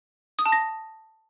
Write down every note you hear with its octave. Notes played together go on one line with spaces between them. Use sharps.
D#6
A5
A#6